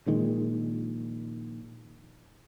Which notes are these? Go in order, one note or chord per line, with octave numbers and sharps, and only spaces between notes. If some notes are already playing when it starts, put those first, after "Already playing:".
A#1 A#2 D#3 G#3